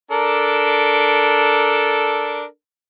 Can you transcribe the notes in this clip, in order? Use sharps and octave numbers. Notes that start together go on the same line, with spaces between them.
D4 A4 A#4